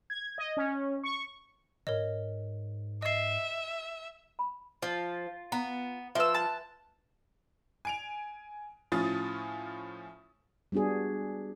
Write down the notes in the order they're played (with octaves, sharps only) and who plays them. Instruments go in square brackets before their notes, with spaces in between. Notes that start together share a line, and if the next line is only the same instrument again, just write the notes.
[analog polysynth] G#6
D#5
C#4
C#6
[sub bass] G#2 [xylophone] A#4 C#5 D#5
[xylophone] D#5 C7 [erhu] E5
[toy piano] B5
[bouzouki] F3 [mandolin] F4
[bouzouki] B3 [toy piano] A#5
[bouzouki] F3 [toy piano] B4 E5 [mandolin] C6 E6
[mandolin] A5 F#6 [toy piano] C6
[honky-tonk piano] G#5 D7 F7
A2 F3 C#4 F4 D#6 A6
[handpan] G3 B3 D4 F#4 G#4